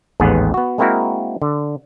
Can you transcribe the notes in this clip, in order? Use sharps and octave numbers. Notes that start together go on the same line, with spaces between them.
A1 D#2 G#2 B3 G#4 F#5
B3 F#4
G#3 A#3 C4 E4 F#4 A#4
D3